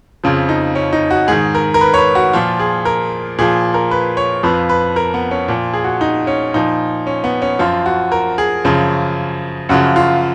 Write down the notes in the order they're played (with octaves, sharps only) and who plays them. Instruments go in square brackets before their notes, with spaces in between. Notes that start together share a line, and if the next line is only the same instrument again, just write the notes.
[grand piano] F2 C#3 F3
D#4
C#4
D#4
F#4
G#2 D#3 G#4
A#4
A#4
B4
C#5
B4
F#4
A#2 F3 F4
G#4
A#4
A#2 F3 G#4
A#4
B4
C#5
F2 F3 B4
B4
A#4
B3
C#4
A#2 F3
G#4
F#4
D#4
C#4
A#2 F3 D#4
C#4
B3
C#4
F#2 F3 F4
F#4
A#4
G#4
F#2 C#3 F3
F#2 C#3 F3 F#4
F4